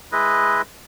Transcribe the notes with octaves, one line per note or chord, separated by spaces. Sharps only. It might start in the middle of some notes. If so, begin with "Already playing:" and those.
G#3 E4 B4 D#5